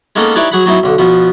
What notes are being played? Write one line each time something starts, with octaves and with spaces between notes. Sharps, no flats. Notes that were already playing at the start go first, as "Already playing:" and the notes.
G#3 A#3 B3 C#4 D#4 A4
D#4 E4 G4 B4 C#5 D5
F#3 G#4 F#5 B5
F#3 B3 D#4 E4
B1 D3
B2 F3 B3